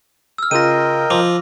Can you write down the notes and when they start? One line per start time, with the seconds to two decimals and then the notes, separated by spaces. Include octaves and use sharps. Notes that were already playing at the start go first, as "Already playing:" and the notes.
0.38 E6 F6
0.51 C#3 F4 A#4 D#5 G5 A#6 D#7
1.10 F3 D6